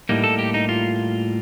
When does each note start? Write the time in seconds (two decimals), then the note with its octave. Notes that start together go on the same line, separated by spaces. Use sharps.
0.09 A2 G3 A#3 D#4
0.24 A4
0.39 G4
0.54 D#4
0.69 F4